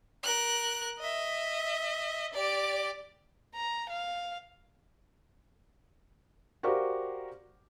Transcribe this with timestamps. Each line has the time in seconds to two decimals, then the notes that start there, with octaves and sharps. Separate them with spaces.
0.24 A#4 F#6
0.99 D#5 E5
2.33 G4 D5
3.55 A#5
3.90 F5
6.63 F#4 G4 A#4 C5 D5 F5